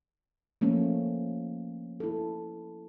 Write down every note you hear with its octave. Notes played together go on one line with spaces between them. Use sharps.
F3 A3 A#3 C#4
E4 A4